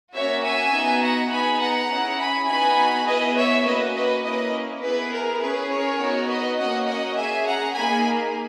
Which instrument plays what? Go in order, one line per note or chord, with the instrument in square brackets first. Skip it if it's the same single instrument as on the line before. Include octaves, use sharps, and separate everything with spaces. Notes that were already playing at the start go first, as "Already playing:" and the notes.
[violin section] A#3 C#4 F#4 C#5 E5
E5 G#5
B3 D#4 F#4
F#5 A#5
B3 D#4 G#4 G#5 B5
F#5 A#5
C#4 E4 G#4
G#5 B5
B3 D#4 F#4 G#5 B5
B3 E4 G#4 B4 D#5
C#5 E5
A#3 C#4 F#4 B4 D#5
B4 D#5
A#3 C#4 E4 B4 D#5
B3 E4 G#4 B4
A#4
C#4 G#4 B4
A#4 C#5
B3 D#4 F#4
B4 D#5
A#3 C#4 F#4 D#5 F#5
D#5 F#5
C#4 G#4 E5 G#5
F#5 A#5
A#3 D#4 G#4 G#5 B5